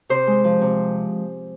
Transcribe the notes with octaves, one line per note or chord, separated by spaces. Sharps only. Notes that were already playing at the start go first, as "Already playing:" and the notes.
C3 C5
G#3
F3
C3